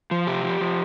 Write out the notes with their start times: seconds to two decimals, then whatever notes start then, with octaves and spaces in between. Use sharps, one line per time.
0.11 F3
0.27 C3 G4
0.44 F3
0.61 F3